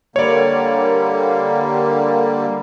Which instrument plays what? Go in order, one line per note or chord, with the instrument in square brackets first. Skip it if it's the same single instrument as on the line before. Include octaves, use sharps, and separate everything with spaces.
[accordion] D3 G3 A#3 [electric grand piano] C#5 D5